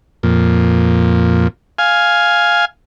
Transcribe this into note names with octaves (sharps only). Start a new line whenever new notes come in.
F2 A#2
F5 G#5